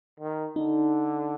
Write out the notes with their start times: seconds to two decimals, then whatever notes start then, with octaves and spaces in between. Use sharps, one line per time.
0.20 D#3
0.56 D3 D#4